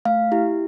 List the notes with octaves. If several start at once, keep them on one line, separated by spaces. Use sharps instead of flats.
A3 F5
E4 G4